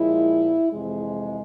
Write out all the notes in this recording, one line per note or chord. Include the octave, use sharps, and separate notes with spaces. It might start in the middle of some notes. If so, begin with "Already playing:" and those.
Already playing: A#2 F3 G#3 E4
F2 C3 E3 G#3